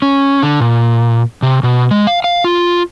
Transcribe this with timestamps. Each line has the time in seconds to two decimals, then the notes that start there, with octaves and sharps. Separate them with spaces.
0.02 C#4
0.43 D3
0.60 A#2
1.43 C3
1.63 B2
1.91 G#3
2.07 F5
2.24 F5
2.44 F4